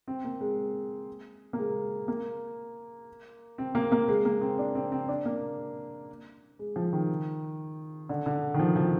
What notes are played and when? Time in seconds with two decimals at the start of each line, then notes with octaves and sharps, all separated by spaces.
0.08 C4
0.24 A#3
0.41 G#3
1.53 A#3
1.58 G#3
2.08 A#3
3.58 C4
3.75 A#3
3.92 A#3
4.08 G#3
4.25 A#3
4.41 C4
4.59 D4
4.75 C4
4.92 C4
5.09 D4
5.26 A#3
6.59 G#3
6.76 F3
6.93 D#3
8.09 D3
8.26 D3
8.54 D#3
8.60 F3
8.76 F3